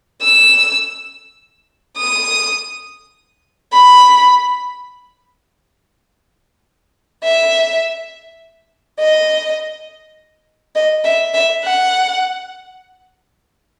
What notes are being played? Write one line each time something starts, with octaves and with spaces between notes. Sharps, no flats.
E6
D#6
B5
E5
D#5
D#5
E5
E5
F#5